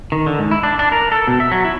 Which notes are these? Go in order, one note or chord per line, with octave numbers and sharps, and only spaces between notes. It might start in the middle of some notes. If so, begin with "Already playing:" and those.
D#3
D3
G#2
E4
D4
D4
A#4
A4
B2
E5
F#3
E4